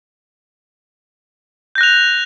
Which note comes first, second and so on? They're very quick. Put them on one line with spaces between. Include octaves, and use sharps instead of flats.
G6 A#6 F#6 F7